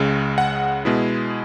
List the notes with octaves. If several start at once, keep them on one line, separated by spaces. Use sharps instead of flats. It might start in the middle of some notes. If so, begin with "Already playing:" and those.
Already playing: C#2 C#3 G#3
F#5
B2 G#3 B3 E4